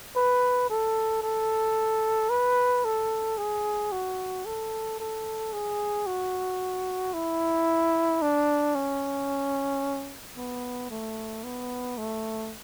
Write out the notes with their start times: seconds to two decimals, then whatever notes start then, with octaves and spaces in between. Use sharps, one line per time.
0.16 B4
0.70 A4
1.23 A4
2.30 B4
2.85 A4
3.38 G#4
3.92 F#4
4.45 A4
5.00 A4
5.53 G#4
6.07 F#4
7.14 E4
8.22 D4
8.75 C#4
10.37 B3
10.90 A3
11.44 B3
11.98 A3